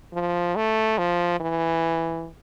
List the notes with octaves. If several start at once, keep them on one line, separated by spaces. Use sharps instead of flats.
F3
A3
F3
E3